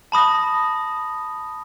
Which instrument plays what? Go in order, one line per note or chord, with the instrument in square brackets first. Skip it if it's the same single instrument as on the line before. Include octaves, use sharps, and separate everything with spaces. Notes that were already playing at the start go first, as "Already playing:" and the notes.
[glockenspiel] A5 B5 D#6 A#6